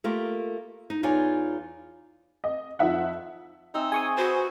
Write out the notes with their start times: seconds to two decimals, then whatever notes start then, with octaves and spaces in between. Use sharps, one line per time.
0.04 A3 A#3 F4 G4 A#4
0.90 D#4
1.03 E2 D#4 F4 C#5 D5 G#5
2.44 D#5
2.79 F2 F3 D#4 E5 F#5
3.74 C4 D#4 E5 G#5
3.92 G#4 C5 G#5 C#6 D#6
4.18 F#4 B4 C5 F#5